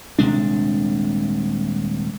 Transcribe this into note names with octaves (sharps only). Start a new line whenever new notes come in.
D#1 C3 G#3 D4